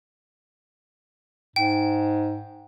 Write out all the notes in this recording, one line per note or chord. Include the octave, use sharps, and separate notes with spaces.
G#2 G5